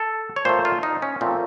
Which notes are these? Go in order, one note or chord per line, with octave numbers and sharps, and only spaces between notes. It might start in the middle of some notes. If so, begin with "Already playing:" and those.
Already playing: A4
C#5
A#2 A3 C5
F4
D#4
C#4
A#2 F3 A3 C4